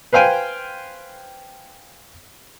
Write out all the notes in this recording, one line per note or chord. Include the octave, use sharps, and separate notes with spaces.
B4 C5 F5 G5 G#5